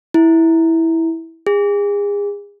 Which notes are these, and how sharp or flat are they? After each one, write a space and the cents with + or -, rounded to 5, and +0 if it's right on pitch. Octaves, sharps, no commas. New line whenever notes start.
E4 -10
G#4 -35